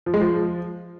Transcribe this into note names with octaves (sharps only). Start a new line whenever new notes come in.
F3
G#3
F3